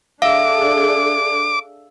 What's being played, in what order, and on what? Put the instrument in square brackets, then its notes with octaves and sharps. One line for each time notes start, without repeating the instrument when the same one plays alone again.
[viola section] D4 G#4 A4 [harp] E5 [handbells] F5 [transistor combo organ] D6